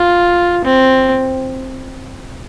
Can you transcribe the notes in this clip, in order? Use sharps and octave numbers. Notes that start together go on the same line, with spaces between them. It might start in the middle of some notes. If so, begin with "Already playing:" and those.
Already playing: F4
C4